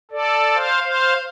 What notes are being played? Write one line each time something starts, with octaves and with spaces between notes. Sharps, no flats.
A4 D5
C5 F5
C5 F5